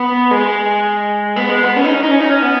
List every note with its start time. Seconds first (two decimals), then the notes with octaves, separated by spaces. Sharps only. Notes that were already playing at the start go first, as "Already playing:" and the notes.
Already playing: B3
0.31 G#3
1.36 B3
1.49 G#3
1.63 B3
1.76 C#4
1.84 D#4
1.94 C#4
2.03 D#4
2.11 C#4
2.20 D#4
2.30 C#4
2.42 B3